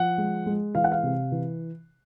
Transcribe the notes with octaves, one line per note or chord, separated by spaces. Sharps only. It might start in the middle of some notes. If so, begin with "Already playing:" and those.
Already playing: F3 F#5
G#3
G#3
E3 F5
F#5
F5
C3
E3